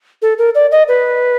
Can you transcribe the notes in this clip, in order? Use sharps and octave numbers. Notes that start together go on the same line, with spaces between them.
A4
A#4
D5
D#5
B4